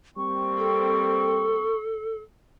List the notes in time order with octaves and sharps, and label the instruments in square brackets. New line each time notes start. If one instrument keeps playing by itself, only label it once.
[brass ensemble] G3 A#3 C4 [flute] C#6
[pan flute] A4